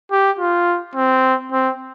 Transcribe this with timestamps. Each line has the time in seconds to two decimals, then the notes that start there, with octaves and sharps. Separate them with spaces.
0.12 G4
0.40 F4
0.96 C4
1.52 C4